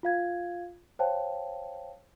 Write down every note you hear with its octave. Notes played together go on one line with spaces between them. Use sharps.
F4 F5 G#6
C5 C#5 F5 G5 A5